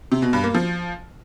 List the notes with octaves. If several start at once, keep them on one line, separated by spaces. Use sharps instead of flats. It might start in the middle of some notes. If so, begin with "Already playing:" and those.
C3
B2
G2
A#3
F3